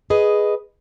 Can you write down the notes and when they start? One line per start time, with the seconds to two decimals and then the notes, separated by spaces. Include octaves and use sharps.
0.10 G#4 B4 D#5